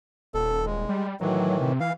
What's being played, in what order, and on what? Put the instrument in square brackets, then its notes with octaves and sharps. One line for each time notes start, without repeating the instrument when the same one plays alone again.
[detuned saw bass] D#1 [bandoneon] A4
[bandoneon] G#3
[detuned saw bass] G3
[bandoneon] A2 D#3 E3 [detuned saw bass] F#3
[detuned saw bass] C3
[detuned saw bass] E3 [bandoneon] F5